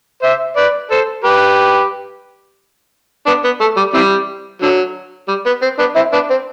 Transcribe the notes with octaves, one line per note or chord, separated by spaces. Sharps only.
C5 E5
B4 D5
A4 C5
G4 B4
B3 D4
B3
A3
G3
C3 E3 G3
D3 F#3
G3
B3
C4
B3 D4
C4 E4
B3 D4
C4